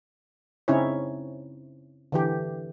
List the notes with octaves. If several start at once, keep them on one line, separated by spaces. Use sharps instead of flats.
C#3 C4 C#4 D#4 E4 C#5
D3 E3 G4